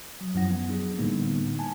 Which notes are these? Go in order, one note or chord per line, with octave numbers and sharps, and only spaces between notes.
F#3
F#2 F3 F#3 E4 F#5 A#6
B3
F#3 D4 G#4
A2 D3 G3 A#3 B3 D#4
G#5 A5